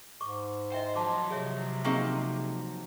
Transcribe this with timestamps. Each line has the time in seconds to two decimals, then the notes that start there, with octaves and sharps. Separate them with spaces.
0.21 G#2 C#6 D6
0.72 C5 D#5 E5 G5
0.95 F3 F#3 A5 C6 D6
1.30 C3 G#4 C#5 E5
1.84 A#3 C4 D#4 G#4 C#6 E6